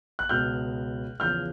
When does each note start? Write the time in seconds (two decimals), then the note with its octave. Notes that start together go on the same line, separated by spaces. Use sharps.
0.19 F#6
0.29 C#2 B2 F6 G6
1.20 E2 C#3 F3 F6 G6